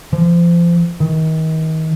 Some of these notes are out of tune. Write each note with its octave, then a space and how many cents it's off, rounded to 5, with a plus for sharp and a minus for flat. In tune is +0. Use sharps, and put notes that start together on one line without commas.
F3 -30
D#3 +35